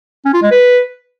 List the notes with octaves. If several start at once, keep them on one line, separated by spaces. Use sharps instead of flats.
C#4
F4
G#3
B4